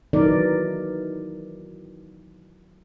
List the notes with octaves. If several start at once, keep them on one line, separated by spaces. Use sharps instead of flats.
D#3 E3 F#3 D#4 A#4 D5